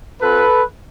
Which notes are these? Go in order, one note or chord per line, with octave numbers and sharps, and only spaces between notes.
C4 F4 A4 B4